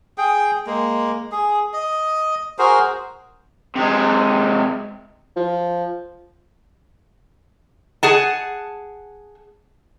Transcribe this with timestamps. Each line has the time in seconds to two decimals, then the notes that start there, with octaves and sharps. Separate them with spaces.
0.18 G#4 G5
0.67 G#3 A#3
1.32 G#4
1.74 D#5
2.59 F#4 G#4 A#4 C5
3.76 C3 G#3
5.36 F3
8.03 G#4 F#5 A5